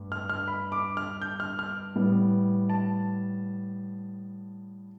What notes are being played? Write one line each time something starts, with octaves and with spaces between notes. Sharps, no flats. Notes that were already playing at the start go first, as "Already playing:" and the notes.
Already playing: G2 A3
F6
F6
B5
D6
F6
G6
F6
F6
A2 G3 B3
A5